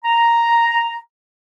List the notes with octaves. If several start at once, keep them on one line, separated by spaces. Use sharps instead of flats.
A#5